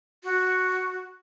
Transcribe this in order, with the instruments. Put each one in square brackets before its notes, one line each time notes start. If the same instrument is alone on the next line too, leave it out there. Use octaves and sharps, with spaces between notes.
[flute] F#4